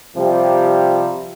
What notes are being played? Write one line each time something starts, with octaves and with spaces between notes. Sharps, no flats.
C3 F3 G3